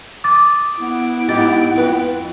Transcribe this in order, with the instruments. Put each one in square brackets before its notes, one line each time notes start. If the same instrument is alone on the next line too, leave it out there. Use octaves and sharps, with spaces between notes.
[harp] D6 D#6 A6
[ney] B3 [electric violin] E4 D7
[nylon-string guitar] G#2 D#4 G4 [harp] A6
[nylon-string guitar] F2 B4 F#5